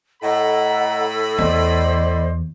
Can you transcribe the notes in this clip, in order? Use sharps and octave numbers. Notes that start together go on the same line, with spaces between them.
A2 A4 D#5 F#5 A#5 B5
E2 C5 D5 D#5